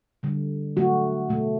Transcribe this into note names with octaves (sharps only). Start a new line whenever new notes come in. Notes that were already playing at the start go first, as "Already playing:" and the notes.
D3 G3
D3 F#3 A3 F#4
B2 A3